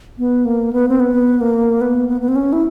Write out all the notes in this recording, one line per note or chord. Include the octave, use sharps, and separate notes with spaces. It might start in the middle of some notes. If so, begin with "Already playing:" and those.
B3
A#3
B3
C4
B3
A#3
B3
B3
B3
C4
C#4
E4